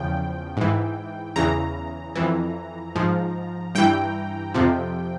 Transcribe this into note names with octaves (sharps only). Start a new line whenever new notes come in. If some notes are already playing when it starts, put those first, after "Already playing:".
Already playing: E2 C#3 F3 G5
G#2 E3
E2 C#3 E3 A#5
F2 E3
G#2 F3
G2 E3 G5
F2 C3 F3